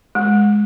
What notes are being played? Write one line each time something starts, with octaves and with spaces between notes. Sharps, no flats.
G#3